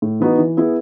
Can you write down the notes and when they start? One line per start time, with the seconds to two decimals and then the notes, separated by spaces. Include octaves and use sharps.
0.02 A2
0.20 E3 B3 D#4 F#4
0.38 E3
0.57 B3 E4 G#4